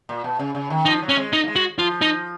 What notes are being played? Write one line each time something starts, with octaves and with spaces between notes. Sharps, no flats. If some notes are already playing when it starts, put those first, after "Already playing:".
A#2
B2
C#3
C#3
D#3
F3 D#4
F#3
C#4
G#3
D#4
A#3
G#3
F#4
F3 F4
D#4